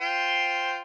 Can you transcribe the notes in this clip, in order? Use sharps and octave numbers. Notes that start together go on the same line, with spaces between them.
F4 C5 G5